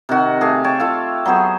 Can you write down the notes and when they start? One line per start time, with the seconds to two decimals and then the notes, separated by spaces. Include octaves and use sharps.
0.09 C3 D#3 F#4
0.41 A3 G4 G#4 F5
0.64 C#5 G5 A5
0.80 F4 A4 F5
1.25 F#3 B3 G#4 C5